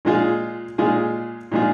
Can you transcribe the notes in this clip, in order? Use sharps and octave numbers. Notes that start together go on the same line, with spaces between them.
A#2 G#3 F4 G#4
A#2 G#3 F4 G#4
A#2 G#3 F4 G#4